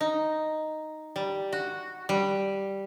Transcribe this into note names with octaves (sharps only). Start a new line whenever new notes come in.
D#4
G3
F#4
G3